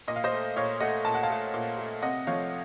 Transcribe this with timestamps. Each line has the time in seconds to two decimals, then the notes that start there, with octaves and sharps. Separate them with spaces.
0.08 A#2 D#5
0.16 F5
0.24 C5 D#5
0.32 A3
0.56 A#2 C#5 F5
0.81 A3 D#5 F#5
1.05 A#2 A5
1.14 F#5
1.23 F5 A5
1.30 A3
1.54 A#2
1.78 A3
2.02 C3 D#5 F#5
2.27 F3 A3 C#5 F5